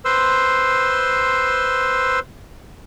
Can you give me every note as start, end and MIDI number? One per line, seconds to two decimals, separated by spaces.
0.05 2.20 71
0.05 2.20 72
0.05 2.20 84
0.05 2.20 88